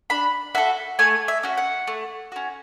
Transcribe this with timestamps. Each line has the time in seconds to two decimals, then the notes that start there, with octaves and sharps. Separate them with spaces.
0.10 D4 B5
0.55 F#4 A4 E5
0.99 A3 G#5
1.28 E5
1.43 C#4 F#4
1.57 F#5
1.87 A3
2.32 C#4 F#4